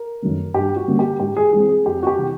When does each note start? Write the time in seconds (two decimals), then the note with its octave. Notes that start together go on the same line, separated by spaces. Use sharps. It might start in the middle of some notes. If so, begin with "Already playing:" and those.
Already playing: A#4
0.22 F#2 D#3 F#3 A3
0.54 G2 G4
0.76 F#4
0.88 D3 G3 A#3 C#4
0.99 G4
1.20 G#2 G4
1.37 G#4
1.53 E3 G#3 C4 G#4
1.69 G#4
1.85 F2 G4
2.03 F#4
2.07 G4
2.17 C3 E3